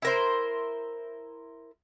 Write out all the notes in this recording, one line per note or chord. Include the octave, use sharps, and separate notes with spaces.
E4 A#4 C5